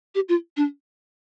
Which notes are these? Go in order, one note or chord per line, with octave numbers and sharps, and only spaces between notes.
G4
F4
D4